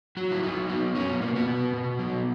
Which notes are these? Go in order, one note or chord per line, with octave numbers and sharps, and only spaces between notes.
F#3 F#4
E4
F#3 D#4
F#3 B3
F#3 C#4
B3
B2 A#3
B3
B2
B2
F#3